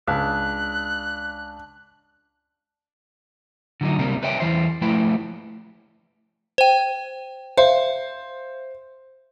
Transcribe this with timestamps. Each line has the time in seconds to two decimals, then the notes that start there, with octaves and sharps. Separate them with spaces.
0.07 C#2 D4 F#6
3.81 D3 F#3 D#4
3.99 C#2 C3 G3 A#3 D4 A#4
4.23 B4 C#5 D#5 E5 G5
4.40 E2 G#2 E3 C5
4.82 F3 A3 E4 B4 G5
6.58 C5 G5
7.57 C5 E5 F5